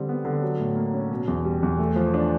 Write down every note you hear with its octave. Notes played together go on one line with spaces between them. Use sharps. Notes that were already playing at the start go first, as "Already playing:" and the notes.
Already playing: D3 G3 C4
B3
D3
F#3
A2
A#3
C#4
B2
E2
G3
E2
A3
F3
D4